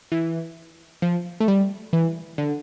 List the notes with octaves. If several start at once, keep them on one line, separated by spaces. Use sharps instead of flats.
E3
F3
A3
G3
E3
D3